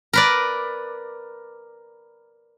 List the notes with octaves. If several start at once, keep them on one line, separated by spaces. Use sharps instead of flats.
A#4 B4 D5